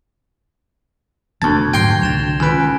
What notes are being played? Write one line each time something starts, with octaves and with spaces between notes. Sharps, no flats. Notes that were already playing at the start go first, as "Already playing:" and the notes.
E1 D2 D3 B3 A5 G#6
G#2 D3 F#3 G5 C6 G#6 A#6 G7
C2 D3 D4 A6 E7 F7
C#2 D#3 C#4 B4 G#5 D7